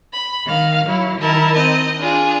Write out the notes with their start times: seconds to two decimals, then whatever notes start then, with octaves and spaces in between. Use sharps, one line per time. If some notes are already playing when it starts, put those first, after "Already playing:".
0.13 B5
0.45 D#3 F5
0.85 F#3 E4
1.19 D#3 E4 A#4 A5
1.56 C4 D#5
2.00 D4 F4 G#4